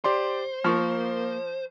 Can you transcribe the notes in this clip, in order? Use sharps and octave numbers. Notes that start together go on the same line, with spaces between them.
G4 C5 D5 C6
F3 A#3 A#4 C#6 F6